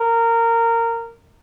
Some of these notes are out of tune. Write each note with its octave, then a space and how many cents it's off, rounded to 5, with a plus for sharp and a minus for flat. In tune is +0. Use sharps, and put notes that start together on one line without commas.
A#4 -15